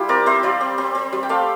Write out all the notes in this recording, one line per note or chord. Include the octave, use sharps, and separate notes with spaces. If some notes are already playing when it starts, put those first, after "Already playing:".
Already playing: G3 E4 F4 G4
C4 A#4 D5
C4 C5 E5
G3 D5 F5
C4
C4
C4
G3
G5
A3 D5 F5